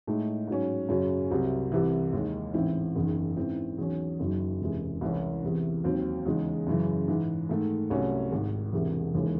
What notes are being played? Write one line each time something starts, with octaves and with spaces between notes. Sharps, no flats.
A2 G#3 D#4
G#2 F#3 C#4
F#2 C#3 F#3 C#4
C2 C3 F#3 C4
C2 C3 E3
D#2 D#3 G#3 D#4
A1 G#2 E3 C4 E4
F#1 E2 D#3
G#2 E3 C4 E4
E2 D#3 F#3 C#4
F#1 F#2 D#3 F#3
E1 E2 C3 E3 G#3
C2 C3 E3 G#3 C#4
E2 C3 E3
D#2 D#3 F#3 C4
E2 C#3 G#3 D#4
F#2 C#3 E3
G#2 E3 G#3
G#2 D#3 A3
C2 C3 F#3 A3 C#4
G#1 G#2 D#3
E1 E2 C3 E3
E1 D#2 C#3 E3 G#3